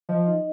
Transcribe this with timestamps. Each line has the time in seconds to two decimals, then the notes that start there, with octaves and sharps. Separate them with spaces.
0.09 F3 D#5
0.27 D#4